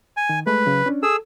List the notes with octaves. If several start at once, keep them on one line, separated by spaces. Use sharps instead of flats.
G#5
D#3
G#3 A3 B4
C#3 F#3
C#4 D4
G#4 A4 E6